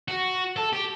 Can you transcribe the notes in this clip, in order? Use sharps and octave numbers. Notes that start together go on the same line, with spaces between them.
F#4
A4
G4